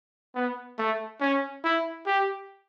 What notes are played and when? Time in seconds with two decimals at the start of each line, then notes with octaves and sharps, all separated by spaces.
0.35 B3
0.79 A3
1.21 C#4
1.64 E4
2.06 G4